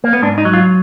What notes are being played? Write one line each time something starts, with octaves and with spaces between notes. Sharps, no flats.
A#3
B3
G#2 D4
D#4
F#3
F4